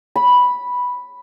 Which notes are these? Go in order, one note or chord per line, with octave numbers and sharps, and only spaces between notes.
B5